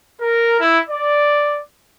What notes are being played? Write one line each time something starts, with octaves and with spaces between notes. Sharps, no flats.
A#4
E4
D5